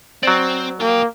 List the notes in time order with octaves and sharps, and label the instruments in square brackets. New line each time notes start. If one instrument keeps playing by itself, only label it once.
[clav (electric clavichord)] F#3 D5 [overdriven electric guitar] C4
[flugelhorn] A#3 [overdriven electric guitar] F4 G5